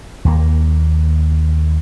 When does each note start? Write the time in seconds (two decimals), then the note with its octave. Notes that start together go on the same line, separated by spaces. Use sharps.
0.25 D#2 A#3